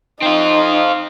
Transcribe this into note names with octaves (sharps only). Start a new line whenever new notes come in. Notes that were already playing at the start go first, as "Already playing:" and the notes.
C4 D#4 F4